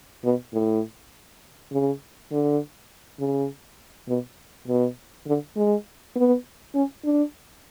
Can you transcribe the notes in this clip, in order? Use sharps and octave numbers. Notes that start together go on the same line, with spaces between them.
B2
A2
C#3
D3
C#3
B2
B2
D3
G#3
B3
C#4
D4